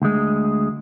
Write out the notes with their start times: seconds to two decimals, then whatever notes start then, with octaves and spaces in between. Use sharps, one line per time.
0.02 D2 G#3